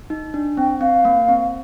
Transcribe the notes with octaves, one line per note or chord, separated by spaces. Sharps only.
D#4
D4
C4 G5
C4 F5
A#3
C4